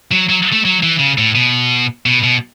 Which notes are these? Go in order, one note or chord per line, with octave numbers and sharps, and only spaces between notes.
F#3
F#3
A3
F#3
E3
C#3
A2
B2
B2
B2